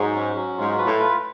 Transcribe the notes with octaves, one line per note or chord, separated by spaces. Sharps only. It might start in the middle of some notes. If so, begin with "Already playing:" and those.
Already playing: G#2 F#3
C#4
F#3
G#2 F4
B4
A2
F4